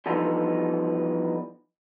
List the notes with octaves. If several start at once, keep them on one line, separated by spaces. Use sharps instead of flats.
D3 E3 F3 G3 B3 D#4